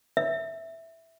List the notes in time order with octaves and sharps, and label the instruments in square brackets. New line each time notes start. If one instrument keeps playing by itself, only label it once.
[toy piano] E5